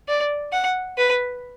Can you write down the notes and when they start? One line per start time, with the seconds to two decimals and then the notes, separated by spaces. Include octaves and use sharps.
0.08 D5
0.53 F#5
0.98 B4